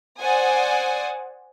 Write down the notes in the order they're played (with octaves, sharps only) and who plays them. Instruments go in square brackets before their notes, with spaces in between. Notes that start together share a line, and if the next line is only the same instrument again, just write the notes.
[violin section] C5 D5 F#5 G#5 D#6